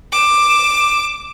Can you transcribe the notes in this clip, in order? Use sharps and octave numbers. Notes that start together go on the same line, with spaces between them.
D6 E7